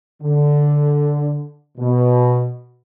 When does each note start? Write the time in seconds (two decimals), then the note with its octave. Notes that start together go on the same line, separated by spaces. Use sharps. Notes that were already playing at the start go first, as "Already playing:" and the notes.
0.22 D3
1.78 B2